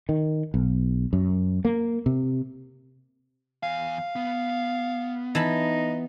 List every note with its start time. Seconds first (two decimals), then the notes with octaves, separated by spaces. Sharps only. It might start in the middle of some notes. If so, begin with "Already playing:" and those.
0.09 D#3
0.54 B1
1.13 F#2
1.65 A#3
2.06 C3
3.63 E2 F5 G#5
4.16 B3
5.35 E3 D#4 A5 B5